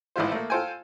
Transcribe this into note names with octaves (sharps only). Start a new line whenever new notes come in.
A1 G#2 E3 E4 F4 C5
A3 A#3
F4 A4 C5 G5 G#5